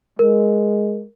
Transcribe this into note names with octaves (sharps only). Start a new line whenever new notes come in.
G#3 A#4